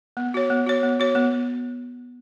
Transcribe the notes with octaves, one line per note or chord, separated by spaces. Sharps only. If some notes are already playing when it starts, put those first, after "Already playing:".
B3
F#4 C#5
B3
F#4 C#5
B3
F#4 C#5
B3